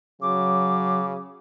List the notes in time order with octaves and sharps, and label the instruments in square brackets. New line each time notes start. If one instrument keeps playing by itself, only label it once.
[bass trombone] C#3 [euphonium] F#3 [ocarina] D6